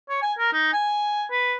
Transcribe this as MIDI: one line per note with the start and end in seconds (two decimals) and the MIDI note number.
0.09 0.18 73
0.22 0.33 80
0.38 0.52 70
0.52 0.68 63
0.73 1.24 80
1.31 1.56 71